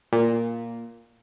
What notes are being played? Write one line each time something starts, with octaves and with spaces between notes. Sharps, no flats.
A#2